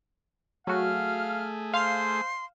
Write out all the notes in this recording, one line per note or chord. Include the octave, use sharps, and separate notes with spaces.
F#3 A3 F#4 G#4 F5 F6
C5 F5 C6